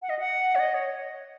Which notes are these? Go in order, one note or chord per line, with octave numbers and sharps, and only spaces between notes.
F#5
D#5
F#5
C#5
D#5
C#5